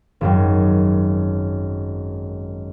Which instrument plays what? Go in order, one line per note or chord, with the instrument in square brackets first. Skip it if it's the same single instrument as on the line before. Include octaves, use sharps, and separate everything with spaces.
[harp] G#1 F#2 F#3